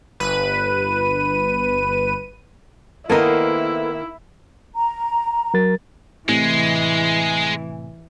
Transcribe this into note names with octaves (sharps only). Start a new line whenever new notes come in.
G1 B4 D#7
D#3 A#3 B3 E4 A4 A#4 C5 D#5
A#5
F#3 A#4 A6
A2 C3 E3 G#3 G#5